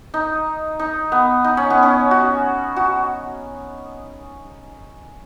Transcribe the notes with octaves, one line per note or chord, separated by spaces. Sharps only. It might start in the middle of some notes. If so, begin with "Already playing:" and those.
D#4
D#4
B3
D#4
C#4
B3
C#4
F#4
F#4